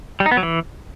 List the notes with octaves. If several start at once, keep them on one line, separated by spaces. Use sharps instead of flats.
G3
D#4
B3
F#3
E3